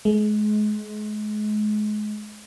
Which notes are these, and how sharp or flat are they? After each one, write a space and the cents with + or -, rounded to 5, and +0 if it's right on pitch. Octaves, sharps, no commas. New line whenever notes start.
G#3 +30